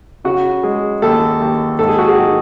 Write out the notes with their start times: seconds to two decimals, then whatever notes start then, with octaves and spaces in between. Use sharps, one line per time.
0.24 C#3 F#4
0.63 G#3
1.02 D#2 A4
1.41 D#2
1.79 G#2 A4
1.89 G#4
1.99 F#4
2.08 G#4
2.18 D#3